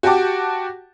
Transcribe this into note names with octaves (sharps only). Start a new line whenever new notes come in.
F#4 G4 F#5 G5 A5 D6